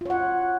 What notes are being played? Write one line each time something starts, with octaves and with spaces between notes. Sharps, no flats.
F4 C#5 F#5